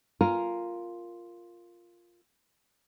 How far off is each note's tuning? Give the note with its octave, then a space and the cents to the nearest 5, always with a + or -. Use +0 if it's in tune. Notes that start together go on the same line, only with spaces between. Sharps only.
F4 +0 A#4 +0 G#5 +5